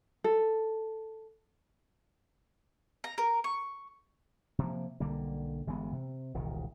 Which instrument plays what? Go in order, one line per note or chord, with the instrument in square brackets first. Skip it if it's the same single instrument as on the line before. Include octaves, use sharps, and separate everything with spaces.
[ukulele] A4
[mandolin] A#5
A#4
C#6
[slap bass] C3 F3 A#3
B1 D3 G3 A#3
G1 E3 G#3 B3
C3
E1 C2 A#2 D#3